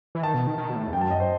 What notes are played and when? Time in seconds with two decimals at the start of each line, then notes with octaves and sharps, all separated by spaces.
0.15 E3
0.22 D#3 A5
0.34 B2
0.47 D#3
0.58 D#3
0.70 B2
0.76 A2
0.87 E2
0.93 F#2 G5
1.01 A5
1.11 D#5
1.20 C5